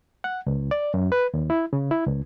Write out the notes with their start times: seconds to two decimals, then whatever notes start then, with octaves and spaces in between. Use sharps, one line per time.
0.24 F#5
0.47 C#2
0.71 D5
0.94 F#2
1.12 B4
1.34 D#2
1.50 E4
1.73 C#3
1.91 E4
2.07 C#2